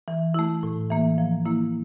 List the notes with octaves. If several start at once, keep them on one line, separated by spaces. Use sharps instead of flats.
E3
A3 E4
A2
E3 A#3
F3
A#3 E4